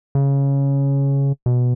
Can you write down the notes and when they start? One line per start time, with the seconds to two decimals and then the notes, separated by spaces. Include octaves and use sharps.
0.15 C#3
1.46 B2